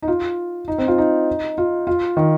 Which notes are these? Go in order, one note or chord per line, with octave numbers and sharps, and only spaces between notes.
D#4
F4
D#4
C4
F4
D#4
F4
F4
D#3